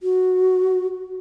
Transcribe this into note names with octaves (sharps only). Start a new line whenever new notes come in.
F#4